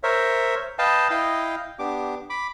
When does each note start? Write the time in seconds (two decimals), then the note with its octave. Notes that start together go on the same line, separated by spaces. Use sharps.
0.03 A#4 C5 C#5 E5
0.79 B4 D#5 F5 G5 A5
1.11 E4 D#5 F5 G5
1.79 B3 D4 G4 D6
2.30 B5 D6